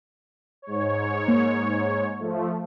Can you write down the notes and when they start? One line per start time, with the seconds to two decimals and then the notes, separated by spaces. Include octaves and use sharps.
0.62 G#2 C#5
1.28 A#3
2.19 F3 A3